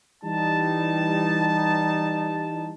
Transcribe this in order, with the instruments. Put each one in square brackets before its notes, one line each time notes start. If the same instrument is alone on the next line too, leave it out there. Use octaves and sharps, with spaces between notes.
[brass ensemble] E3 G3 D#4 A5